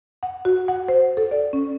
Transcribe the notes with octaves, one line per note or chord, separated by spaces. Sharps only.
F#5
F#4
F#5
C5
A4
D5
C#4